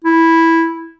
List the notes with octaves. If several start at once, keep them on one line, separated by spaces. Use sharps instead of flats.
E4